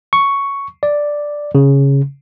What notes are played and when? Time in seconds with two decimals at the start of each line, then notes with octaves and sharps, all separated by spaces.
0.13 C#6
0.83 D5
1.55 C#3